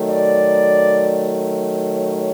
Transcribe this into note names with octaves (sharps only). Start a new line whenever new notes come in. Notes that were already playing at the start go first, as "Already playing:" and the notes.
Already playing: D#3 F#3 A3
D5
C#5